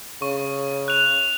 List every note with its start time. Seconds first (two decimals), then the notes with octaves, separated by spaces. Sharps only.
0.22 C#3 C#6
0.88 F#6 F7